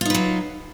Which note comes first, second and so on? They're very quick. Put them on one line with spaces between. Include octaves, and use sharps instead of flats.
F4 D#4 B4 F#3